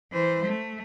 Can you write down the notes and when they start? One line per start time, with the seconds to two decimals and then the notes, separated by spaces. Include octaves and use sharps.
0.12 E3 C5
0.46 A3